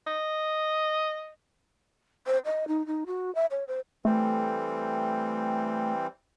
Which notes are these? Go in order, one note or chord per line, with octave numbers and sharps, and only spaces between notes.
D#5
C5
D#5
D#4
D#4
F#4
E5
C#5
C5
E3 G3 A3 C4